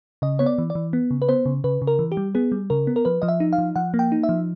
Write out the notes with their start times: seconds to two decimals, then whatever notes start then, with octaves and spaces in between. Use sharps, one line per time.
0.22 C#3 D#5
0.39 B3 C#5
0.46 D5
0.58 E3
0.70 D5
0.75 E3
0.93 B3
1.11 C#3
1.22 B4
1.29 B3 C5
1.46 C#3
1.64 C#3 B4
1.82 C#3
1.87 A#4
1.99 E3
2.12 G4
2.17 G3
2.35 B3 G#4
2.52 G3
2.70 C#3 A#4
2.87 B3
2.96 A#4
3.05 F3 B4
3.22 F3 D#5
3.28 E5
3.40 D#4
3.53 F5
3.58 F3
3.76 F3 F#5
3.94 A#3
3.99 G5
4.12 D#4
4.23 E5
4.29 F3